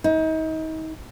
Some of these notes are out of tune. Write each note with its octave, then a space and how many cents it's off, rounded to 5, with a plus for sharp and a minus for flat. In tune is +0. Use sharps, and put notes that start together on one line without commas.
D#4 +35